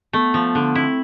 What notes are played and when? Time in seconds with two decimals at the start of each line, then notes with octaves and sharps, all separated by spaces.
0.13 A3 B3
0.34 F3
0.55 D3
0.75 C4 E4